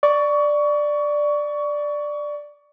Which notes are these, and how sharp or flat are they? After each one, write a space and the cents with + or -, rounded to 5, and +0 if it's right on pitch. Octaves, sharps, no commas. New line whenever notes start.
D5 +5 C#6 +25